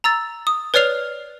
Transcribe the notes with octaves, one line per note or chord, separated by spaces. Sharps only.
A#5 E6 A6
D#6
B4 C#5 D5 F6 C7 F7